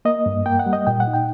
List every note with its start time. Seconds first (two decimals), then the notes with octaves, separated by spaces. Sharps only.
0.05 A#3 D#5
0.26 G2
0.46 A#3 G5
0.59 F#5
0.66 G3
0.73 D#5
0.87 A#2 G5
1.00 F#5
1.07 D#4
1.13 G5